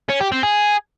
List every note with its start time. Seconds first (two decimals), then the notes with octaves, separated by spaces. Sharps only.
0.09 C#4
0.20 G4
0.32 C4
0.43 G#4